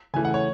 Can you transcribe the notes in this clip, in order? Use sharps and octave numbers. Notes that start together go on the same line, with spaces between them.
C#3 E3 A3 G#5
F#5
C#5